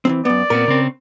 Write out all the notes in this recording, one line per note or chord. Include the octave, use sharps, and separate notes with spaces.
E3 F3 C4
F#2 B3 D5
A#2 B3 C4 A#4
C#3 C4